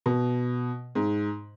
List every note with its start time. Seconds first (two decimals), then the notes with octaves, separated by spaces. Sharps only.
0.06 B2
0.95 G#2